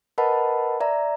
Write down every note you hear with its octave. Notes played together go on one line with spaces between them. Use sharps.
A#4 B4 D#5 F#5 A5 B5
D5 E5 A#5